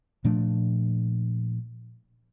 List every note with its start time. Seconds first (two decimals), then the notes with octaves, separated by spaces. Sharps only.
0.24 A#2 F3 A3 D4